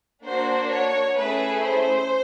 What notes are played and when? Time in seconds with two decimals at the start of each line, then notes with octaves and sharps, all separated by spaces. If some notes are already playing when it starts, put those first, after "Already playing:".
0.23 A#3 D4 F#4 C5
0.69 C#5
1.15 A3 C#4 E4 G#4 B4
1.62 C5